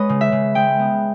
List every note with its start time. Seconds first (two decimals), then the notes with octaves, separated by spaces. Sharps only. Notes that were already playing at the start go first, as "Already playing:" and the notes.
Already playing: G#3 B3 B4 C#5 D#5
0.09 C#3
0.21 E5
0.32 C#3
0.55 G#3 G5
0.79 B3